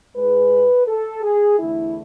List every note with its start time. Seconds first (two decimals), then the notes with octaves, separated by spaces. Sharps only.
0.16 G#2 G#3 B4
0.87 A4
1.23 G#4
1.59 E2 D3 A3 E4